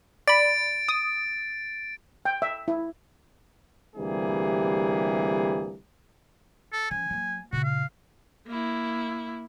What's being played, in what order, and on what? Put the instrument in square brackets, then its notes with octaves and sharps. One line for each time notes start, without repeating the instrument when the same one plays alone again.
[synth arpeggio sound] D5 B5 [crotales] A6 D7
[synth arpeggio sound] D#6
[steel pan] G5
E5
E4
[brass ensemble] D2 C3 E3 G3 A#3 G#4
[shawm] A4
[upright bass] F3 C#4 [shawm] G#5
[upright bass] F#3 A#3
[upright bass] A#2 C#3 [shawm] F#4
[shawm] F5
[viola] A#3 E4